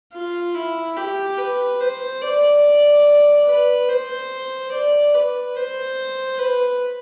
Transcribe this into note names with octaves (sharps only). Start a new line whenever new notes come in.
F4
E4
G4
B4
C5
D5
B4
C5
D5
B4
C5
B4